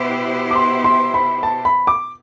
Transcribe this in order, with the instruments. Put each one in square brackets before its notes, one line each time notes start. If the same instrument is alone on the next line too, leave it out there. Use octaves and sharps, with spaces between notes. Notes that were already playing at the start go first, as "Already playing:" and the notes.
Already playing: [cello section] B2 B3 E4 G4 C5
[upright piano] D6
C6
C6
B5
A5
B5
D6